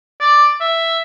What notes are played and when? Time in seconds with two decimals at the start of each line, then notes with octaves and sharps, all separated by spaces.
0.20 D5
0.61 E5